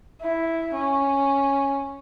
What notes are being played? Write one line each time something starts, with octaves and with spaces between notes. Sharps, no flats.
E4
C#4